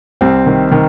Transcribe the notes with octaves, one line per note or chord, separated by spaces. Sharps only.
C2 C4
D#3
D#3